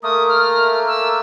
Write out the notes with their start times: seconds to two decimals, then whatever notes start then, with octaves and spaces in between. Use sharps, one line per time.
0.03 A3 A#3 A#4 D#6
0.29 F6
0.88 E6